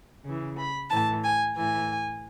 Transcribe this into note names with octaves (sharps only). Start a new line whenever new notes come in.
C#3 E3
B5
A2 E3 A5
G#5
A2 E3 G#5